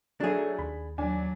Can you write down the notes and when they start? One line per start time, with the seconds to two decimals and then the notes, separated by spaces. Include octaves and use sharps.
0.20 F#3 A3 D4 G#4
0.59 D#2 B5
0.98 D#2 F#3 D4 G#5